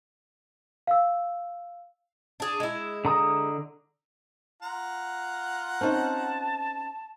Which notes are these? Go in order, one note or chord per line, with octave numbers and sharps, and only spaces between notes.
F5 E6
D4 G#4
G#3 E4
D3 A#5 D#6
F4 F#5 A#5
C4 C#4 D#4 A5